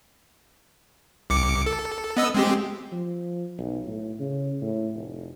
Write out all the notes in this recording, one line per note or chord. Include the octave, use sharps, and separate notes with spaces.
C2 D6 C#7
A4
B3 D#5 E6
G#3 C4 G4
F3
B1
A2
C#3
A2
F1